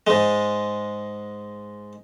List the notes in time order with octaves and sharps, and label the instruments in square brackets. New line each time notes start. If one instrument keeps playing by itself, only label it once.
[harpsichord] G#2 G#3